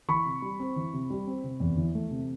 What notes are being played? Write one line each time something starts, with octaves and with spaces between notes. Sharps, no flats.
E3 B5 C#6
C3
G3
C4
E3
C3
G3
C4
C3
E2
E3
A3
C3